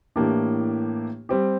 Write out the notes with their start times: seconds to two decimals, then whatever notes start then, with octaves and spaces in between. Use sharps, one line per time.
0.16 A2 E3 A#3 D4 G4
1.29 G3 C4 G4